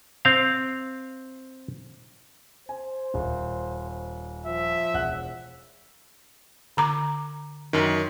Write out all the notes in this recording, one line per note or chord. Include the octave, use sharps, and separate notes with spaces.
C4 F5
C5 G#5
D#1
F3 E5
E1 F#5 F#6
D3 A#5 D6
F#2 D#3